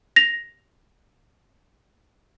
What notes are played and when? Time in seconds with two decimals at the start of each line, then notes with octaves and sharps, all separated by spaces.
0.16 A#6 F7